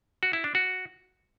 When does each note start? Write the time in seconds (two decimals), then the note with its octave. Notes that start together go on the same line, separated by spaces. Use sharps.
0.23 F#4
0.33 E4
0.44 D4
0.55 F#4